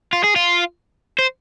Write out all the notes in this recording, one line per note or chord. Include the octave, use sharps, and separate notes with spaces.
F4
G#4
F4
C5